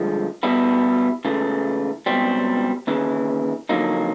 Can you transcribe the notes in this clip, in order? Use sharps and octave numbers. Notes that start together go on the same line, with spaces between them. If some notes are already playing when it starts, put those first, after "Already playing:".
Already playing: G2 D3 F3 G#3
B2 G3 B3 E4
C#2 C#3 E3 A3
C#2 B2 G3 C4
D#2 C#3 E3
F2 D3 F#3 A#3 D#4